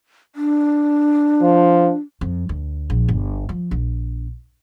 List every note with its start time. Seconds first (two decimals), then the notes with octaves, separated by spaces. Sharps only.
0.36 D4
1.41 F3
2.21 F2
2.49 D2
2.90 A#1
3.09 G1
3.49 F3
3.71 A#1